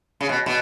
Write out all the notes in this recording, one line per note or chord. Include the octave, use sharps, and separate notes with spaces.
C#3
B2
B2